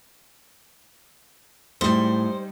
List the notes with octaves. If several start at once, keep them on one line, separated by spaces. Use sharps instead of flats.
A2 G3 G#3 D#4 E4 C5